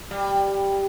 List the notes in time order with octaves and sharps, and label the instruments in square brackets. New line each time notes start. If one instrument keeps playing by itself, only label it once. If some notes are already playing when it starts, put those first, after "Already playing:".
[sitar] G3